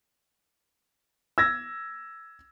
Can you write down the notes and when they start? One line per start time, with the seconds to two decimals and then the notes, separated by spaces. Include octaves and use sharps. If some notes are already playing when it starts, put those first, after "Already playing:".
1.38 E6 G#6 A#6